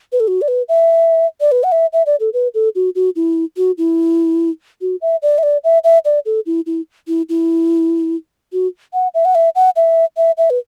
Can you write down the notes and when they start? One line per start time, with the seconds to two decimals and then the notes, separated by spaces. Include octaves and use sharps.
0.12 B4
0.20 A4
0.28 F#4
0.42 D5
0.48 B4
0.69 E5
1.41 D5
1.52 B4
1.64 F#5
1.72 E5
1.93 E5
2.06 D5
2.20 A4
2.34 B4
2.54 A4
2.75 F#4
2.95 F#4
3.16 E4
3.57 F#4
3.78 E4
4.81 F#4
5.02 E5
5.22 D5
5.38 E5
5.43 D5
5.64 E5
5.84 E5
6.05 D5
6.26 A4
6.46 E4
6.66 E4
7.08 E4
7.29 E4
8.53 F#4
8.94 F#5
9.14 E5
9.25 F#5
9.35 E5
9.56 F#5
9.76 E5
10.17 E5
10.38 E5
10.50 B4